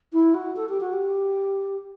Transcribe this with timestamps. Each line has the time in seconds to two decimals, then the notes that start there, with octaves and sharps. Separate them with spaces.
0.13 E4
0.34 F#4
0.56 A4
0.69 G4
0.80 F#4
0.93 G4